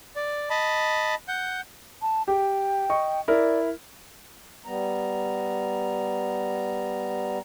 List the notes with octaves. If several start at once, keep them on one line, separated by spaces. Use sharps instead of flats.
D5
D#5 A5 B5
F#5 G6
A5
G4 G5
D#5 C#6
E4 A#4 D5
G3 B3 A#5